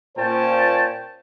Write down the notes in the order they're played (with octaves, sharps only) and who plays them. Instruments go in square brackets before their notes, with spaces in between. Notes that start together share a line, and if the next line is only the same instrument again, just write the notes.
[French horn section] A#2 C5 [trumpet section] C#4 G5 A5